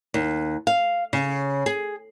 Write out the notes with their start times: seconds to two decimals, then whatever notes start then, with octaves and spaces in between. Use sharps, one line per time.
0.14 D#2
0.67 F5
1.13 C#3
1.66 G#4